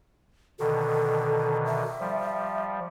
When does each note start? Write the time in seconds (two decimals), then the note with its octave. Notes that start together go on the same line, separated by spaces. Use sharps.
0.60 B2 D3 D#3 A4
1.66 E5
2.00 F3 G3